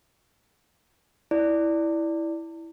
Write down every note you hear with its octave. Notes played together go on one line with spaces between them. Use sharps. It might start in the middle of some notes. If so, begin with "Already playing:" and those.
E4 D5